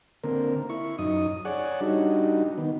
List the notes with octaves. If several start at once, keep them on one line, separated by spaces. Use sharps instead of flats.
D3 A#3 C4 A#4
E4 C#6
F#2 D#4 D#6
G#4 C#5 D5 F#5
G3 D4 D#4 F#4
D#3 B3